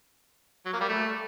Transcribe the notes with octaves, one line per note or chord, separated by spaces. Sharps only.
F#3
A#3
G3
A3